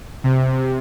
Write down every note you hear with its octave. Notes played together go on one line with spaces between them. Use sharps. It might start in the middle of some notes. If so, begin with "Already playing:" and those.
C3